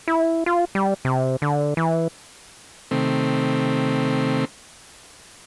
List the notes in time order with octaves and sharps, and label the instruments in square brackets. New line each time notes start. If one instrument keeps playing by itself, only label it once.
[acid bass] E4
F4
G3
C3
D3
E3
[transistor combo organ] C3 D#3 A3 C4